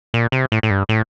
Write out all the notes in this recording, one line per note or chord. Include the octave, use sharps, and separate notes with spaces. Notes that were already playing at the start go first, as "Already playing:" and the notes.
A#2
C3
A2
A2
G2
A2